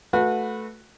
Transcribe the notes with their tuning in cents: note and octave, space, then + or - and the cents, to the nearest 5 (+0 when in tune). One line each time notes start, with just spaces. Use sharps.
A3 -5 F#4 -25 B4 +0